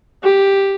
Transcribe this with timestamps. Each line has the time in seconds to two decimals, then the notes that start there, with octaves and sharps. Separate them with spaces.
0.23 G4